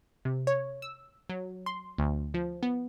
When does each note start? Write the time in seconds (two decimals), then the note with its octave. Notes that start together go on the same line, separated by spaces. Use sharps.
0.25 C3
0.47 C#5
0.82 E6
1.30 F#3
1.66 C6
1.98 D2
2.34 F3
2.63 B3